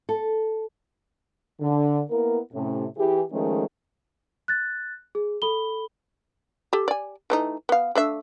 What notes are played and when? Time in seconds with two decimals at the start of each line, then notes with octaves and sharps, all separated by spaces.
0.09 A4
1.60 D3
2.09 A#3 B3 E4 A#4
2.53 A2 C3 C#4
2.97 E3 G4 G#4
3.31 D#3 F3 G#3 A3 C#4 G#4
4.48 F#6 A6
5.15 G#4
5.42 A4 B5 G7
6.73 G4 A4
6.88 D5 G#5
7.30 E3 A3 D#4
7.69 B3 F5
7.95 A3 D4 E5